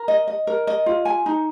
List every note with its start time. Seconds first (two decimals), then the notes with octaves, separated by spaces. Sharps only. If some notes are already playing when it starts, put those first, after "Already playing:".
Already playing: A#4
0.08 D#5
0.27 D#5
0.47 A#4
0.67 D#5
0.86 F4
1.05 G#5
1.26 D#4